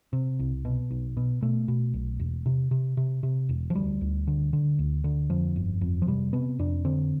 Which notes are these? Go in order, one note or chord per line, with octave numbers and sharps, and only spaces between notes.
C3
C2
B2
B1
B2
B2 A3
B2
B1
E1
C3
C3
C3
C3
E1
F3
D2 G3
D2
D3
D3
D2
D3
F2 F3
G1
F2
F3
C3 G3
C3 B3
F2 D4
D3 C4